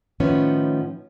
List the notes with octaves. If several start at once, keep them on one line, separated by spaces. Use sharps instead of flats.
A2 D#3 F3 B3 C#4